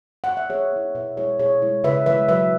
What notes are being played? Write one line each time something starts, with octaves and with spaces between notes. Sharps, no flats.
F#5
E5
E3 G#4 C#5
B3 E4
B2 B4 E5
G#3 E4 G#4 C#5
B2 G#4 C#5
G#3 E4
C#3 B4 E5
E3 G#3 B4 E5
F#3 B4 E5